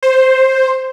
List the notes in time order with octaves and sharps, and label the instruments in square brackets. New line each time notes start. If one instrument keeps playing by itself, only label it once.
[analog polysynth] C5